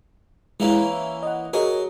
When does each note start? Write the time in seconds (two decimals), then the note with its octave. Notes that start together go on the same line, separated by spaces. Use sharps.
0.60 E3 G#3 A#3 C#4 E4
0.88 E5
1.23 D#5 F#5
1.53 F#3 G#4 A#4 C#5 D#5